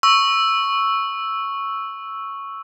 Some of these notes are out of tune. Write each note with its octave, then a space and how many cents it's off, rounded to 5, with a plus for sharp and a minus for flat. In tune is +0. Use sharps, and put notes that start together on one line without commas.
C#6 +0 E6 +0